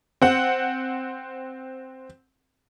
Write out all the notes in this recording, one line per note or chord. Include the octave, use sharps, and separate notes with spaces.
C4 F#5